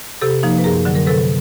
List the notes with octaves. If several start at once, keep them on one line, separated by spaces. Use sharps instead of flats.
C3 G4 A4
F3 A#3 D#4
B4
F#2 G#4 A#4
D3 F#3
A#4
C3 A4 B4